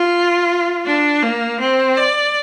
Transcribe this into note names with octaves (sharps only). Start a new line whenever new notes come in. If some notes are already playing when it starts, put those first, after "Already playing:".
Already playing: F4
D4
A#3
C4
D5